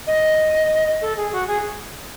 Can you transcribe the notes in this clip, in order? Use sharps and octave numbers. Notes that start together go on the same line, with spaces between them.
D#5
A4
G#4
F#4
G#4